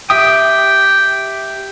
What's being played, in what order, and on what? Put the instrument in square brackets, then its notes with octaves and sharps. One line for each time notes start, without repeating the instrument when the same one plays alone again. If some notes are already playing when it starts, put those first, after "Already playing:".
[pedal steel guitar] G4 E5 D#6 [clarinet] G5